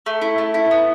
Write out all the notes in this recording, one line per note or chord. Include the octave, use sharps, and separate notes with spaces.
A3
E4
A3
E4
B3